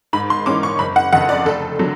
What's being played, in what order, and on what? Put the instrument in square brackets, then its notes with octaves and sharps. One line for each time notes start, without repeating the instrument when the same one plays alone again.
[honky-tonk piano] G#2 B5
C6
E3 G#3 C#4 D6
C#6
F#1 B5
F#5
F2 C#3 F#5
D5
F1 A4
D3 F#3